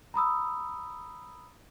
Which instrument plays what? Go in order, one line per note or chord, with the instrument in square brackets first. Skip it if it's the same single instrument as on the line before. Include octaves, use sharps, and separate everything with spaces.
[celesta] A#5 B5 D#6 E6